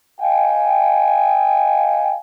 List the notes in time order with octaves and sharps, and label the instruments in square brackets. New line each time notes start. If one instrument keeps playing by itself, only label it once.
[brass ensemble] D#5 F5 G5 G#5